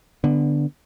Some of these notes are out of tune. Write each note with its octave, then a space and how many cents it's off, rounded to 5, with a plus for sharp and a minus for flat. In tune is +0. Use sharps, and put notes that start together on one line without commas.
D3 +0 B3 +0